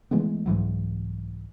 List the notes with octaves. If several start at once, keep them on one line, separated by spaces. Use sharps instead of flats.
E3 G#3 A3 B3
C2 G#2 E3 F#3